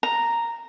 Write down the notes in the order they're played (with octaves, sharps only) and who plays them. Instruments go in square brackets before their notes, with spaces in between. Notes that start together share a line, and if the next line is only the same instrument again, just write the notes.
[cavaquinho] A#5